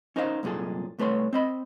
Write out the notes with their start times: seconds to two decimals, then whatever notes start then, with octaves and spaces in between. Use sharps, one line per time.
0.16 C#4 D#4 A#4 C5 C#5 F5
0.43 C2 F#2 A#2 G#4 A4
0.99 C2 A3 B4 C#5 C6
1.33 C4 D#5 B5